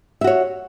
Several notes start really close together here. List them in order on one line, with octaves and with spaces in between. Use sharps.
E5 F#4 C#5